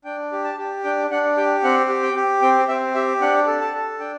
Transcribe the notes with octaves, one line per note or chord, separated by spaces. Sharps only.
D4 G5
G4
A5
G4
D4 G5
D4 F#5
G4 G5
C4 F#5
G4
G5
G4
C4 G5
C4 E5
G4 E5
D4 F#5
A4
A5
A4
D4 G5